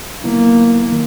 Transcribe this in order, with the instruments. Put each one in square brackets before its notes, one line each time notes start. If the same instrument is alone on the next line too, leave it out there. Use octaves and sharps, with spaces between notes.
[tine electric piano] D3 F#3 B3 E4 [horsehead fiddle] A#3
[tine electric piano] D#3